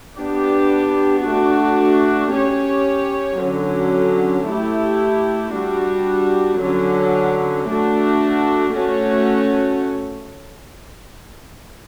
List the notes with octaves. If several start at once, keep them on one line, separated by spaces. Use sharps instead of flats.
B3 D4 G4
A3 D4 F#4
C#4 G4 C#5
D3 F#3 C#4
A3 E4 G4
G3 D4 F#4
D3 F#3 C#4
A3 D4 F#4
A3 C#4 F#4 C#5